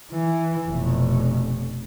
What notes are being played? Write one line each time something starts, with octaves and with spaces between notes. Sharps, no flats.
E3
F1 B2